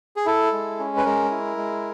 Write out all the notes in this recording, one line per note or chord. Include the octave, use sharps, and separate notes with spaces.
G#4
E4 A4
G#3
C#4
B4
G#3 A#4
E4
G#3